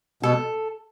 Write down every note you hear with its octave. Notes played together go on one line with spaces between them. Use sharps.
B2 A4